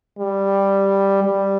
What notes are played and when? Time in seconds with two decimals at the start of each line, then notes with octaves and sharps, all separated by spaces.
0.19 G3
1.24 G3